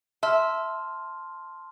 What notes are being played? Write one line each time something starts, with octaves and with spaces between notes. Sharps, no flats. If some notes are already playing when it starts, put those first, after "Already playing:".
E5 A5 C6 F6